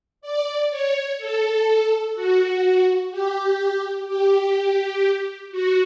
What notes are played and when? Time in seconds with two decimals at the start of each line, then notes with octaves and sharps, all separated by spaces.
0.21 D5
0.70 C#5
1.18 A4
2.15 F#4
3.11 G4
4.08 G4
5.51 F#4